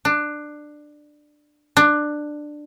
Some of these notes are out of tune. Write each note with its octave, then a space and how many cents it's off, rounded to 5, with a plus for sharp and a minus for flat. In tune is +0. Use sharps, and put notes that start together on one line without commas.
D4 +15
D4 +15